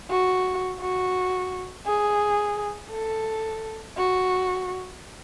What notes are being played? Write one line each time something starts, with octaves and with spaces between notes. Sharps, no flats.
F#4
F#4
G#4
A4
F#4